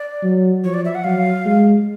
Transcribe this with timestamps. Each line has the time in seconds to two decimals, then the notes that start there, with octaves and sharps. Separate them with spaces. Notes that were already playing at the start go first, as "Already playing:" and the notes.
Already playing: D5
0.23 F#3
0.64 F3 C#5
0.74 D5
0.85 E5
0.95 F#5
1.04 F#3 F5
1.45 G#3